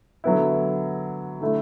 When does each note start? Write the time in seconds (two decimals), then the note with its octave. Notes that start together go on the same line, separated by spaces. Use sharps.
0.24 D3 F#3 B3 E4
1.41 D3 A3 E4